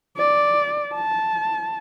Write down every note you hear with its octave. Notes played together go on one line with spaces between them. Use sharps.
D5
A5